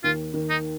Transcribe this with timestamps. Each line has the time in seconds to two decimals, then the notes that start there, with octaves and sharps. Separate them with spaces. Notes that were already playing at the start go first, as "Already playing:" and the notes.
0.04 D#2 F4
0.34 D#3
0.50 D#4